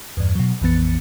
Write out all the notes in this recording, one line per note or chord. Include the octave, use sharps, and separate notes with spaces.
E2 G2
B2 F#3
A#1 F2 E3 B3 A6 C#7